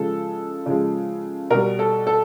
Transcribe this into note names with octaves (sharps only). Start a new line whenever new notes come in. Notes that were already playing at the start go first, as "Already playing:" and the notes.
Already playing: C#3 F3 G#3 A4
C#3 F3 G#3
B2 G3 A#4
A4
A4